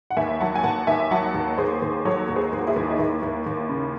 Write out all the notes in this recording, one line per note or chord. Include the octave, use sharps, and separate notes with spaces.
F#5
D#2 E5 G#5
F#3 F#5 A5
G#5
D#2 F#5 A5
D#2 E5 G#5
F#3 F#5 A5
D#2
D#2 G#4 C5
D#2
F#3 A4 C#5
D#2
G#4 C5
D#2
F#4
E4 G#4
D#2
D#4
D#2 E4
D#2
D#2
C#3